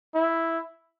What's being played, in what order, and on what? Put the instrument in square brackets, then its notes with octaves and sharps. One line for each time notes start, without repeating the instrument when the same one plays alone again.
[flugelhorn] E4